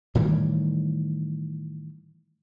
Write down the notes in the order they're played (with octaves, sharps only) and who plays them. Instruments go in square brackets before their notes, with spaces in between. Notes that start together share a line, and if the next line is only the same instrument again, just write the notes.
[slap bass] A2 D#3 E3 G3